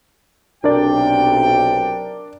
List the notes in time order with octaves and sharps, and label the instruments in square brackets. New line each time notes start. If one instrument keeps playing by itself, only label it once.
[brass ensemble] B1 C3 G5 [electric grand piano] D4 A#4 D5